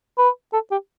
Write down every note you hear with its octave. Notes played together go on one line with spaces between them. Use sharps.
B4
A4
G4